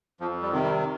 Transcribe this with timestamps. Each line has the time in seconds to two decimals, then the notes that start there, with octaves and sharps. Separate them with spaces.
0.20 F2 F3
0.42 G3
0.52 C3 D#3
0.63 G3